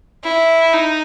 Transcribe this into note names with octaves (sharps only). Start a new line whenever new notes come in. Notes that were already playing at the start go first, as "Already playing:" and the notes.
E4
D#4